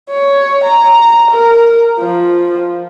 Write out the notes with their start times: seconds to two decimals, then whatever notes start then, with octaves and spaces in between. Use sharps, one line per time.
0.11 C#5
0.65 A#5
1.31 A#4
2.00 F3